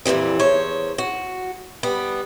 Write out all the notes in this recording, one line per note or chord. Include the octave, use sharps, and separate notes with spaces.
F2 A#2 D#3 E3 G3
E2 C5 C#5
F#4
G3 B3